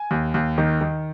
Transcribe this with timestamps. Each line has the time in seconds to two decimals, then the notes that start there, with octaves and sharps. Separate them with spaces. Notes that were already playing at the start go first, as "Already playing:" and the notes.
Already playing: G#5
0.11 D#2
0.34 D#2
0.58 D#3
0.81 D#3